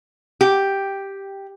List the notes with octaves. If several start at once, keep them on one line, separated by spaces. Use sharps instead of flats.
G4